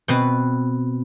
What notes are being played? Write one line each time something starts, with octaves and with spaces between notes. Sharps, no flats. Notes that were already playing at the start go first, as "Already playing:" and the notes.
B2 C4 B4